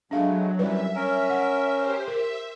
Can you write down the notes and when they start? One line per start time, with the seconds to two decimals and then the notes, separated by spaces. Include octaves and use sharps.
0.11 B2 F#3 G#3 A3 D4 F5
0.59 F#2 C3 E3 G3 B4 E5
0.95 C#4 A#4
1.30 F#5
1.75 G4 C5
2.07 A#4 E5